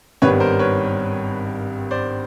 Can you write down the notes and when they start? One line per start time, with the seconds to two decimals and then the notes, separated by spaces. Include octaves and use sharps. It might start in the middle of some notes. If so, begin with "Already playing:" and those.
0.22 G#1 G2 D#3 G3 B3 B4 C#5
0.40 A#4 C5
0.59 B4 C#5
1.91 C5 D5